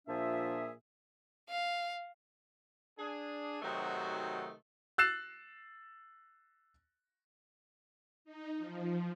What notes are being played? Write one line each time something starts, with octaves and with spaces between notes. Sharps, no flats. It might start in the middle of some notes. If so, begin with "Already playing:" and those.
A#2 F3 D4 G#4 E5
F5
D4 G#4
C3 D#3 F#3 A3 D#4 F#4
E6 F#6 A6 C7 E7
D#4
F3